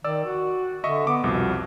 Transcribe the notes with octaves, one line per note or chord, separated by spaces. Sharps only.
D#3 D5 E6
F#4
D3 D#5 E5 C#6
B3 D6
C2 F2 B2